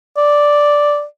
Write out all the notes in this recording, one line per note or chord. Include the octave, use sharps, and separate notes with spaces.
D5